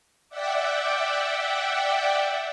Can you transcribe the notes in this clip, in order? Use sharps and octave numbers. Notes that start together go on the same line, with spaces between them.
D5 E5 F#5 G5